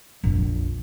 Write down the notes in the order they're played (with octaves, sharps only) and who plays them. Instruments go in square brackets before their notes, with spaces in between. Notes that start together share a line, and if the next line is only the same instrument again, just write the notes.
[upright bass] A#1 F2